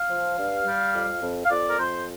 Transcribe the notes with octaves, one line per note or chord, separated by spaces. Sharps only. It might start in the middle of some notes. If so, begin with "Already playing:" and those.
Already playing: F5
F3
G2
G3
F2
F2
F5
F2 D5
A#4
F2 C5